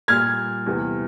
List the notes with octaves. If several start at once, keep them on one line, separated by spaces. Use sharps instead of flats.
A#2 G3 F6 G#6
E2 C3 G3